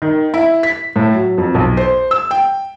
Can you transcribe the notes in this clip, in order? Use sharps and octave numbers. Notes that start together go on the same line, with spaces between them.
D#3
E4
B6
A2
F#3
F2
B1
C5
E6
G5